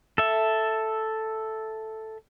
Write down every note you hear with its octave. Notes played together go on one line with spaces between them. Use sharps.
A4 E5